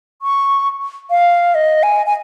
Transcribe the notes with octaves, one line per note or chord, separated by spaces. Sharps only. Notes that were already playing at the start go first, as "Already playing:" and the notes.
C#6
F5
D#5
G#5
G#5